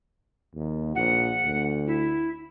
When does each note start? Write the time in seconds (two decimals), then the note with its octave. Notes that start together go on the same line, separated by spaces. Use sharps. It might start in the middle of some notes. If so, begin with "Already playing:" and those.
0.54 D#2
0.95 A#1 F#5
1.45 D2
1.87 E4